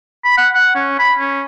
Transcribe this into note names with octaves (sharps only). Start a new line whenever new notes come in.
B5
F#5
F#5
C#4
B5
C#4